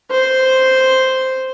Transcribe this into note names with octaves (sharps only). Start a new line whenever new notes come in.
C5